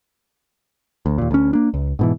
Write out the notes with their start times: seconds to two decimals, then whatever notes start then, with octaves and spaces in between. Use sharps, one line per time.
1.06 D2
1.18 D#2 A#2
1.31 D2 C#4
1.53 A#3 D4
1.74 C#2
1.99 G#2 B2 E3